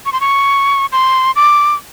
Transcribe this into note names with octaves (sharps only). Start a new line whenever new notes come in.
C#6
C6
C#6
C6
D6